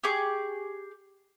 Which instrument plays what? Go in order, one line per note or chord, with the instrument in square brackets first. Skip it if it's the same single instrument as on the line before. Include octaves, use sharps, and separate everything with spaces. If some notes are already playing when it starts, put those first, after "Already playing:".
[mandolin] G4 G#4 C#6 D6